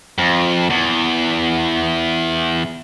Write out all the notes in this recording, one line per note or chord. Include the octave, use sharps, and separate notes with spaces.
F2
E2